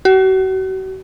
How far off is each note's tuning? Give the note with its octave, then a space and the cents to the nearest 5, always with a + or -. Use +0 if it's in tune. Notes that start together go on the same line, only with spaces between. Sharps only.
F#4 +40